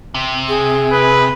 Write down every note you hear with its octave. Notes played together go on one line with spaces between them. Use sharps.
C3
G#4
B4